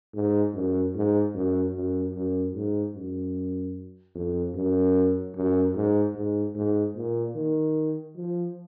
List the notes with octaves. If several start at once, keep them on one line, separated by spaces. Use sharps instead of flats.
G#2
F#2
G#2
F#2
F#2
F#2
G#2
F#2
F2
F#2
F#2
G#2
G#2
G#2
A#2
D#3
F3